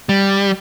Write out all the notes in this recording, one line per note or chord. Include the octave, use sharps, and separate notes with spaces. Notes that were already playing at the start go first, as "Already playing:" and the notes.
G3